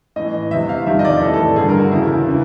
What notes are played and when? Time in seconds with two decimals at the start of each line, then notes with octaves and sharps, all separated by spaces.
0.16 A2 E3 D#5
0.51 E2 C3 E3 E5
0.69 F5
0.87 F2 C3 D#3 E5
0.99 D#5
1.05 D5
1.21 A2 E3 A4
1.34 A4
1.56 G2 D3 G#4
1.69 A#4
1.80 F#4
1.91 E2 C#3 E3 E4
2.28 C#3 E3